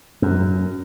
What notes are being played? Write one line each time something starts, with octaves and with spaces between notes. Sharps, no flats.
F#2